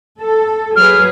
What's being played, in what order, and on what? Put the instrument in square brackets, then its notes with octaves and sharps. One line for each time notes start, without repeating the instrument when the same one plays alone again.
[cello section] A4
[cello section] F#3 G#4 B4 [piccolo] F6